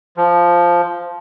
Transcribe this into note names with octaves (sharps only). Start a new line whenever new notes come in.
F3